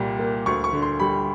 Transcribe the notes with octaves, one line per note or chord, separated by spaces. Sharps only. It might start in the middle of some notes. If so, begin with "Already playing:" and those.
Already playing: C2 A#2 G3
A#3
D2 C#6
C#6
D3
C6
G3 B5